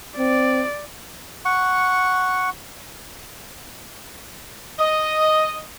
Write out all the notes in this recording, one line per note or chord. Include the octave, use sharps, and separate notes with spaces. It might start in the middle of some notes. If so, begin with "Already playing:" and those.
C4 D5
F#5 C#6
D#5